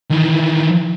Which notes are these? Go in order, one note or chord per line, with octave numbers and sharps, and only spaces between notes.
D#3 E3